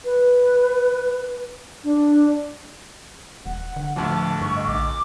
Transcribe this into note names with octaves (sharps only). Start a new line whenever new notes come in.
B4
D4
D#1 F#5
D3
D1 D2 F3 A5
G2 C#6
D#5
A#1 D6